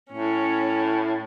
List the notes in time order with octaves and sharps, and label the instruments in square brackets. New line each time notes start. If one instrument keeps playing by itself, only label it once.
[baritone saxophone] A2 [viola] C#4